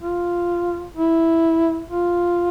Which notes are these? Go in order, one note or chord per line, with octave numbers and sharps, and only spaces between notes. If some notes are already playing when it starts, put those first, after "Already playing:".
F4
E4
F4